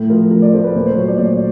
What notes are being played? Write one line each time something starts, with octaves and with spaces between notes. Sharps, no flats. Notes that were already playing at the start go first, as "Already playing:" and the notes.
Already playing: A2 A4
F3 A#4
A2 A#4
D5
A3 C5
B4
A#2 C5
C5
F#3 C#5
D5
A#2 D5